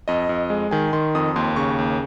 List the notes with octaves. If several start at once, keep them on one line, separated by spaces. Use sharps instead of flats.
F2 D#5
F2
G#3
D#3 G#5
D#3 C6
F2 D#6
D#2 C6
C#3 C#6
D#2